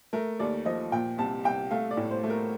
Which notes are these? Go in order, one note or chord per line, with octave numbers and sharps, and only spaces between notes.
A3 A#4
D#2 D5
F3 D#5
A#2 G5
C2 A5
C2 G5
A3 F5
D5
A2
C5
A3
A#4